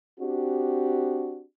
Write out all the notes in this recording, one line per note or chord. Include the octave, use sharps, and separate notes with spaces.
C4 D4 F#4 G4